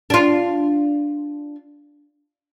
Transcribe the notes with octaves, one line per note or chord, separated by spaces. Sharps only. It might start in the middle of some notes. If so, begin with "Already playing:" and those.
D4 F4